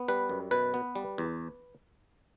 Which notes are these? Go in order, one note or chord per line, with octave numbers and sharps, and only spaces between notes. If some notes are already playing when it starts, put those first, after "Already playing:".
Already playing: B3
G3 B4
F#2
B2 B4
B3
G3
E2